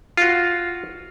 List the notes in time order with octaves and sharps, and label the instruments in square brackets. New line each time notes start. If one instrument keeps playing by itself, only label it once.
[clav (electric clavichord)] F4 F#4